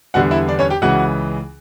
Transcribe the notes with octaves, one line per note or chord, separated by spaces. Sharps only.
E2 D3 G3 B3 F#4 F#5
E4 E5
D4 D5
C#4 C#5
G4 G5
C#2 C#3 E3 F#4 F#5